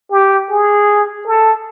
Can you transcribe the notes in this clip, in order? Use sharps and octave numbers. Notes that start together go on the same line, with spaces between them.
G4
G#4
A4